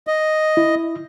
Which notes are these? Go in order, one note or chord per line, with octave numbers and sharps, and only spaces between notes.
D#5
E4